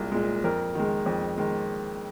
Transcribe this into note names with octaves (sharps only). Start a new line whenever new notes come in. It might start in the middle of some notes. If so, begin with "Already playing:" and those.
Already playing: C2 A#2 G#3
A#2 G#3
F2 A#4
D#3 G#3
F2
D#3 G#3